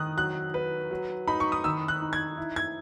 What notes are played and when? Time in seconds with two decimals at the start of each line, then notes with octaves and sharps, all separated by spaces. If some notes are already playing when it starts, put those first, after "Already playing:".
Already playing: D#3 D#6 F#6
0.17 F#3 F#6
0.54 B4
0.91 F#3
1.27 D#4 B5
1.40 C#6
1.52 D#6
1.64 D#3 E6
1.88 F#6
2.01 D#4
2.13 G#6
2.37 E4
2.56 G#6